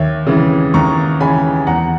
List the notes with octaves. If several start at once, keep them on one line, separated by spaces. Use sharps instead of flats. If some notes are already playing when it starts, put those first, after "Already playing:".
Already playing: D#2 C#5 E5
C#3 E3
D#2 A#5 C#6
C#3 E3 G#5 B5
E2 F#5 A#5